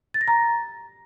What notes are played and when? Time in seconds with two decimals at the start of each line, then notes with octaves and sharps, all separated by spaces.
0.14 A6
0.21 A#6
0.28 A#5